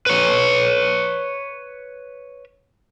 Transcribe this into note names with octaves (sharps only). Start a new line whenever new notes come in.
B4 C#5